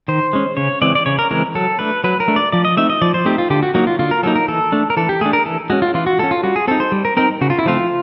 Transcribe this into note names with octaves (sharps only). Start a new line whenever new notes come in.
D#3 C5
G#3 C#4
C#3 C#5
E3 G#3 C4 D5
D5
C#3 C#5
A#4
E3 G#3 C4 A#4
F#3 A4
A3 D4 B4
F#3 B4
A#4
A3 D4
D5
F3 D5
D#5
A3 C4 D#4 E5
D#5
F3 D5
C5
A3 C4 D#4 G4
F4
D3 G4
F#4
F#3 A#3 D#4 F#4
F4
D3 F4
A#4
F#3 A#3 D#4 A4
A#4
E3 A4
A3 D4
A#4
E3 A4
G4
A3 D4 G#4
A#4
E3 A4
G#3 C#4 F#4
F4
E3 F4
F#4
G#3 C#4 A4
F4
G3 F#4
G#4
C4 D#4 A4
C5
G3
A#4
C4 D#4 A#4
C#3 F#4
F4
E4
F3 A3 C4 F4